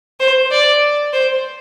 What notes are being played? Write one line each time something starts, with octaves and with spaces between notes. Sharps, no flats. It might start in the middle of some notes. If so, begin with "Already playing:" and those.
C5
D5
C5